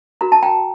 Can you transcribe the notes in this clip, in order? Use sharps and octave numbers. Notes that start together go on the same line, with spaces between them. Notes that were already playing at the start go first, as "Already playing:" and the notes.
F#4 A#4 A#5
A5
G5 A#5